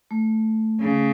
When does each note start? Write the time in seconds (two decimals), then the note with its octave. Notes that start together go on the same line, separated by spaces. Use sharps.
0.11 A3
0.81 C#3